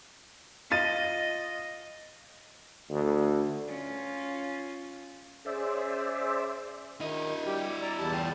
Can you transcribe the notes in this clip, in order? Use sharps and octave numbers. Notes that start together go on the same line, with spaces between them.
F4 D#5 A6 D#7
D2
C#4 F4
C#4 G#4 C5 D5 E5
D#3 E4 D#5
G3 G4
D5 A#5
E2 G3 A5
A3 G5